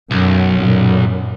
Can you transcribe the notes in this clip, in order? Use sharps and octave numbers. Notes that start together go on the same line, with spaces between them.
B1 F#2
F#2 A#2